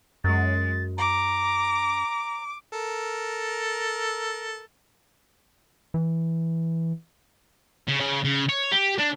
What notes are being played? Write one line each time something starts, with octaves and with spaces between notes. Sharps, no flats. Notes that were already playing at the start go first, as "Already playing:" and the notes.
F#2 G#3 A6
A#5 D6
A4 A#4
E3
C#3
C#3
C#3
C#5
G4
D4